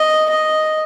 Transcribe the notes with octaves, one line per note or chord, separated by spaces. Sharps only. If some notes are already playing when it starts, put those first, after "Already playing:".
Already playing: D#5
D#5